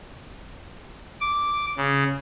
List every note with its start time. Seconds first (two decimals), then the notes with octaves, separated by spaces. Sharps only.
1.21 D6
1.77 C#3